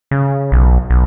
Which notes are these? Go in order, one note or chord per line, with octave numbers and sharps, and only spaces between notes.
C#3
B1
B1